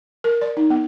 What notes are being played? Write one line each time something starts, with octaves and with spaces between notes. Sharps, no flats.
A#4
D5
D#4
B3